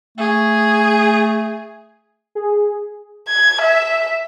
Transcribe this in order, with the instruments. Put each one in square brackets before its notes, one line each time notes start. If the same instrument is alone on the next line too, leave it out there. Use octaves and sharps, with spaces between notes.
[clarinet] A3 [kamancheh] G#4
[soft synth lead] G#4
[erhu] G#6
E5